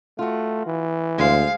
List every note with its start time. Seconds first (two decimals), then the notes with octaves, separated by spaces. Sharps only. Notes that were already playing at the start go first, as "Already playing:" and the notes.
0.19 A3 F4 F#4
0.66 E3
1.18 D2 G#3 C5 F5